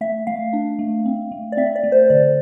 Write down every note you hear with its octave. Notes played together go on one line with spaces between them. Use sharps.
A3 E5
A3 F5
D4
A3
C4
A3
D5
C4 E5
D5
A3
C5
D3 D5